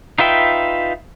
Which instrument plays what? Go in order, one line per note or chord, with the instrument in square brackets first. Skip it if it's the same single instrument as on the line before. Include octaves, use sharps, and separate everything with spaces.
[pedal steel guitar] D#4 F4 B4 E5 G5